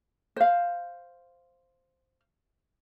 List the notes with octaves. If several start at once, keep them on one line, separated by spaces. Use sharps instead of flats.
C5 F5